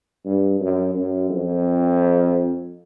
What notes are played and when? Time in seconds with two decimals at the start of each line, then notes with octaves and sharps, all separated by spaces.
0.25 G2
0.60 F#2
0.95 F#2
1.30 F2